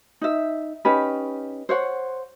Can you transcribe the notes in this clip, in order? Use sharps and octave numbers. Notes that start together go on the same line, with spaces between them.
D#4 E5
C#4 D#4 G4 B4
C5 C#5 F#5